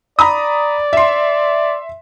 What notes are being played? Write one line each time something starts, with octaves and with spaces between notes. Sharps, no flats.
D5 A#5 B5 D#6
E5 C6